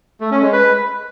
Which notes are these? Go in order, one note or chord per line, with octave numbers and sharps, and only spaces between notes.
A3
C#4
G#3
B4